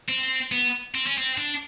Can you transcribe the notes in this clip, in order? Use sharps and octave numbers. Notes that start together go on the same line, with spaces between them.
C4
B3
C4
C#4
C4
D4